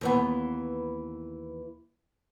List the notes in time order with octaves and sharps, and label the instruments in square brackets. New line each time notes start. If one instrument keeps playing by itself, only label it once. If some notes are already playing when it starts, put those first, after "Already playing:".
[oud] D#2 E3 B3